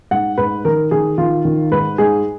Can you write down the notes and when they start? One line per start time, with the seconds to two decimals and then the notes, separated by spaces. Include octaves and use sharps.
0.11 G#2 F#5
0.38 G#2 B4
0.65 D#3 A#4
0.91 D#3 G#4
1.18 D#3 F4
1.45 D#3
1.72 G#2 B4
1.98 G#2 G#4